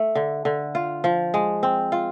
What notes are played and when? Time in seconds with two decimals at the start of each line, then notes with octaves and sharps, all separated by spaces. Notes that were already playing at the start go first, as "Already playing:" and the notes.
Already playing: A3
0.15 D3
0.45 D3
0.75 F4
1.04 F3
1.34 G#3
1.63 C4
1.92 F4